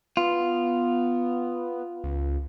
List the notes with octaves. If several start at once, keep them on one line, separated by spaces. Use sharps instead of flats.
B3 F4
C#2